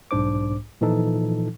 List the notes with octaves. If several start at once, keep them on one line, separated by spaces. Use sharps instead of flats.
B1 G#2 D4 C5 D6
A#2 E3 F3 D#4 A4